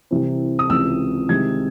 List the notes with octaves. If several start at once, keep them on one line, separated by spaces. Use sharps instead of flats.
C2 C3 E3 C4
D#6
C#2 C3 E3 E6
C2 C3 D#3 G#3 G#6